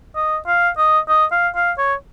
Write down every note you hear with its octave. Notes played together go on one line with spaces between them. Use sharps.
D#5
F5
D#5
D#5
F5
F5
C#5